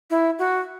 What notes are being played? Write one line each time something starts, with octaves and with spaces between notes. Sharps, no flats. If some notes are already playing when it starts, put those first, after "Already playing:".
E4
F#4